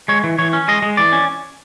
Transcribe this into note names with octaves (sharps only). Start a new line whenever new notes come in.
G#3 C#5
E3
E3 C#5
C#4
G#3 D#5
G#3
E3 D5
C#4